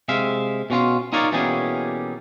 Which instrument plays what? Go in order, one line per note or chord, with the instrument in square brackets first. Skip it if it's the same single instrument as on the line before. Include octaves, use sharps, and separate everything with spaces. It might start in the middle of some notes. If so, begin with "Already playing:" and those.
[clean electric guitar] C3 G#3 E5 F5
B2 C#4 F4 F5
D#4 F4 A#4 C#5 D5 F5
B2 E3 G3 A#3 C#4 G#4